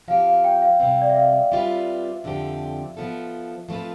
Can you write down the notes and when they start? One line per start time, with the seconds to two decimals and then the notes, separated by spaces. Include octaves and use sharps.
0.08 F3 C4 G4 F5
0.27 F5
0.44 G5
0.62 F5
0.80 C3 G3 C4 G5
1.02 D5
1.09 E5
1.16 F5
1.52 G3 C4 F4 B4 E5
2.24 F2 D3 F3 C4 G4
2.97 F3 B3 F4 A4
3.69 F3 A3 C4 F4 B4